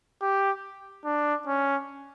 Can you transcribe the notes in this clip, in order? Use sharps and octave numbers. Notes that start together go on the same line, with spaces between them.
G4
D4
C#4